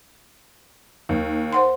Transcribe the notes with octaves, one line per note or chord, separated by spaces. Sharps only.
D#2
C5 F#5 C6